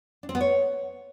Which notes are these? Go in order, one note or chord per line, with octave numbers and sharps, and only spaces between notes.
D4
C4
B3
C#5